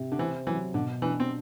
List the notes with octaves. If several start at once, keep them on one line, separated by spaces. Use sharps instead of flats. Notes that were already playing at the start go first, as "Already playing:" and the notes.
Already playing: C3 G4
D3
E3 C5
E3 F#3
B2 D3
E3 D4
C4